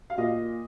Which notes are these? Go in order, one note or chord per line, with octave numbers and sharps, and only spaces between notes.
F5
A#2 D#5